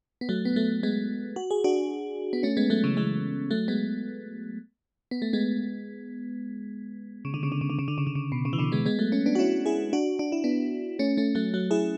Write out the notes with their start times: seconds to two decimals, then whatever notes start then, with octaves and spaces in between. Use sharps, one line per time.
0.21 B3
0.29 F#3 A3
0.45 B3
0.56 F#3 A3
0.83 G#3 B3
1.36 F#4
1.51 G#4
1.64 D4 F#4
2.33 B3
2.43 A3 C#4
2.57 G#3 B3
2.70 F#3 A3
2.84 C#3 E3
2.97 E3 G#3
3.51 F#3 A3
3.68 G#3 B3
5.11 B3
5.22 A3
5.33 G#3 B3
7.25 C#3
7.34 D3
7.43 C#3
7.52 D3
7.61 C#3
7.70 D3
7.79 C#3
7.88 D3
7.98 C#3
8.07 D3
8.15 C#3
8.32 B2
8.45 C#3
8.53 E3
8.59 B2 D3
8.72 G#3 B3
8.86 G#3 B3
8.99 F#3 A3
9.12 A3 C#4
9.26 B3 D4
9.35 F#4
9.39 C#4 E4
9.66 E4 G#4
9.93 D4 F#4
10.19 D4
10.32 E4
10.44 B3 D4
10.99 A3 C#4
11.17 A3 C#4
11.35 F#3 A3
11.54 F#3 A3
11.71 E4 G#4